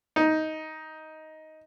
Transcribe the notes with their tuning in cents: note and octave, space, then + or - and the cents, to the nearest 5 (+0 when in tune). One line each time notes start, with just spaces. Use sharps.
D#4 +10